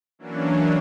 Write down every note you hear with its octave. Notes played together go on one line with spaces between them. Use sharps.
E3 F#3 A#3 C#4 D4